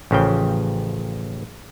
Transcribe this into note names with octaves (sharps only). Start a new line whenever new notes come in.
A1 C#3 F3 G5